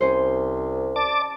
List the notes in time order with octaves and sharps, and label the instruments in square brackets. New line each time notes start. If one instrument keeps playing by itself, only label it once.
[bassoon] C2 [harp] C#4 C5
[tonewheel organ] D5 A5 D6